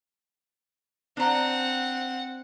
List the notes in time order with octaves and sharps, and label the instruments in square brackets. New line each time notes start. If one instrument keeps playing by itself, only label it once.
[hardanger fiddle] C4 F#5 [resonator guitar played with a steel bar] D4 A#5